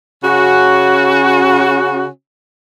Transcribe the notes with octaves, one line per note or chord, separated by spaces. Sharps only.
C#3 C#4 F#4